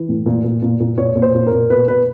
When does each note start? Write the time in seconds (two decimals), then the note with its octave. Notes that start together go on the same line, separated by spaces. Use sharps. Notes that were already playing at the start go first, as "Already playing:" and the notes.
Already playing: E3
0.09 A2
0.26 A#2
0.44 A#2
0.62 A#2
0.80 A#2
0.98 A#2 C#5
1.16 A#2
1.22 C5
1.35 A#2
1.47 A#4
1.52 A#2
1.70 B2 B4
1.88 B2 B4